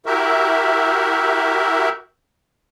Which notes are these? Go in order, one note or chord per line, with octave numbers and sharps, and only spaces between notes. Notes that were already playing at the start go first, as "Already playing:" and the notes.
E4 F#4 G4 A#4 E5